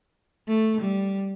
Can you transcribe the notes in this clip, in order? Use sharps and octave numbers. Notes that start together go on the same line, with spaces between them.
A3
G3